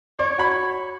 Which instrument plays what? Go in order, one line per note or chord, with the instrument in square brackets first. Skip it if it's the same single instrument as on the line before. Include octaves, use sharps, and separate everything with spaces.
[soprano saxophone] C#5 [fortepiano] D5
[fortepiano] F#4 B5